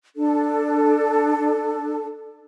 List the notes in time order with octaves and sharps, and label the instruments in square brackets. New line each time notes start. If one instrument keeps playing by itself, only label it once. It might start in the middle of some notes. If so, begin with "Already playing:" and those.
[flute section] D4 A4